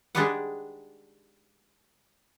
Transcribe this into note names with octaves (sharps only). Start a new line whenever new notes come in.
G#3 D4 D#4 G4 B4 F#5